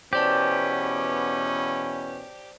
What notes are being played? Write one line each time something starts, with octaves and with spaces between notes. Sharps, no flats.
E2 B2 C#4 G4 C5 D5 A5